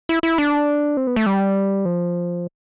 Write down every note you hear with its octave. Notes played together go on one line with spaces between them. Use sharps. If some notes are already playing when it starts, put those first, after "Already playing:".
E4
E4
D4
C4
B3
A3
G3
F3